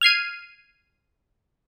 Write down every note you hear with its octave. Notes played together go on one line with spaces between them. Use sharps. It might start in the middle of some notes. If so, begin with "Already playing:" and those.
F6 G#6 C7 D#7